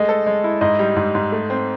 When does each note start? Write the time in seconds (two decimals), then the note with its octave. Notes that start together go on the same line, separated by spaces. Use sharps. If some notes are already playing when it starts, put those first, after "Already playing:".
Already playing: G#3 A3 D#5
0.09 A4
0.26 G#3
0.44 E4
0.61 G#2 D#5
0.79 G3
0.96 G#2
1.15 G#2
1.32 A3
1.50 C4